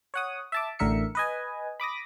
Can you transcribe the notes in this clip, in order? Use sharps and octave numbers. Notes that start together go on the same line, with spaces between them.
C#5 F#5 D#6
E5 A5 D6
A1 A2 D3 A#4 E5 C#7
B4 D#5 G#5
B5 D6 D#6 A#6